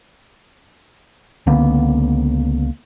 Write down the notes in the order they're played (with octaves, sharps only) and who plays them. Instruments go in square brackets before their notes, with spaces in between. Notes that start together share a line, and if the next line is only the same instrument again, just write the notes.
[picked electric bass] C#2 D3 A#3 B3